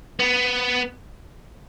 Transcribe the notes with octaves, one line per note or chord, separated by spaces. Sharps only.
B3